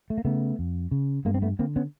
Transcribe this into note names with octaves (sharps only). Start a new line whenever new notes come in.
A3
A#3
C#3 A3 B3
F2
C#3
G2 G#3 A#3
C4
A3 B3
D3 A#3 C4
B3 C#4